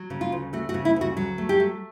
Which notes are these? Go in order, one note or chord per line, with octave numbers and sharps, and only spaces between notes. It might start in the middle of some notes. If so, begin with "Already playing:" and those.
Already playing: F#3
C#3
F4
D2
A3 F#4
F#4
C#3
E4
D2 F#4
F#3
A3
G4
A3